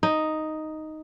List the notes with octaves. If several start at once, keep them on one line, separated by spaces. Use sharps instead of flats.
D#4